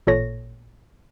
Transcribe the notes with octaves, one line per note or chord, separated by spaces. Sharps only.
A1 A#2 A4 C#5 A#6